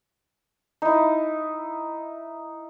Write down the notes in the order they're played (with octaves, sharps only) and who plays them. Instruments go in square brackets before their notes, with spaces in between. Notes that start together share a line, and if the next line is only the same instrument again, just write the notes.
[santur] D#4 E4